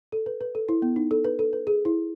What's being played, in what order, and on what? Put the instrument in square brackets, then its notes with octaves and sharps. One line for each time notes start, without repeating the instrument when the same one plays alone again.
[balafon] A4
B4
B4
A4
E4
B3
D#4
A4
B4
A4
B4
G#4
E4